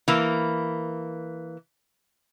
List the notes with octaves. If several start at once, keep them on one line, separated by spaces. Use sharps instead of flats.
E3 A#3